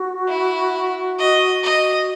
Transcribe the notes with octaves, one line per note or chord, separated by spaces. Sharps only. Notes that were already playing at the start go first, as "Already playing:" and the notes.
Already playing: F#4
E4
D#5
D#5